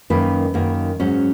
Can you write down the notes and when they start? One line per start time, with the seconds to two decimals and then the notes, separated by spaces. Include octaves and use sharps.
0.10 F#2 D#3 A#3 B4
0.54 F#2 D#3 A#3
1.00 G#2 F#3 C#4